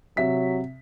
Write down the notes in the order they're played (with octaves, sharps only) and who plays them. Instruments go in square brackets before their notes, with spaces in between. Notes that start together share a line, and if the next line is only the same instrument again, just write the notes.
[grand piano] C3 E5 B6 [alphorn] F#3